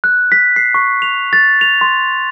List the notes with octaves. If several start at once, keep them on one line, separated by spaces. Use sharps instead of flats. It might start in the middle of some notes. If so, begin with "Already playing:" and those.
F#6
B6
C7
C#6
F7
A6
F7
C6